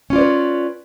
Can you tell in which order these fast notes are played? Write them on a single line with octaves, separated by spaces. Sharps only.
C#4 F4 D5 C5 B4